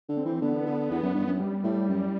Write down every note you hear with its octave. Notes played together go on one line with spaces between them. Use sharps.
D3
C4
E3
D3 B3
D3
E2
F#2
G2
F#2
G3
A2
F#2